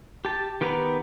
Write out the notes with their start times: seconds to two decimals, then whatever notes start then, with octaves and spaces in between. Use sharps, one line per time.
0.25 G4 A5
0.61 D#3 B3 G4 B4 A#5